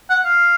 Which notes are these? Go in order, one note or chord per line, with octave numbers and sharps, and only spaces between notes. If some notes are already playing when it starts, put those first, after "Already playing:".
F#5
F5